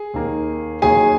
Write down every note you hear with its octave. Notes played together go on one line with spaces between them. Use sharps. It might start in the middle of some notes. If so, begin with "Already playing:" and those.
Already playing: G#4
D#2 D#3 A#3
D#2 D#3 F#3 A#3 G#4 G#5